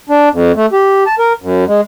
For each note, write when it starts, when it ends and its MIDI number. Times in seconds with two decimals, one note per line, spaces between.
0.09 0.29 62
0.32 0.52 41
0.56 0.66 57
0.72 1.04 67
1.06 1.15 81
1.19 1.33 70
1.42 1.64 42
1.68 1.81 56